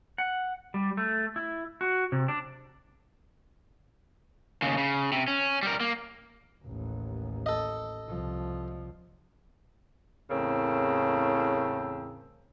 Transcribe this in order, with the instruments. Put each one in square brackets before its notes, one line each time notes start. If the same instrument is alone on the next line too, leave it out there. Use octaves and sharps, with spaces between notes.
[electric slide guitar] F#5
G3
A3
E4
F#4
C3
D4
[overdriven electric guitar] D#2 C#3
C#3
C3
C#4
G3 A#4
A#3
[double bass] A1 D#2
[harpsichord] A4 D#5
[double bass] C2 F3
[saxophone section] E2 A2 C#3 C4 A#4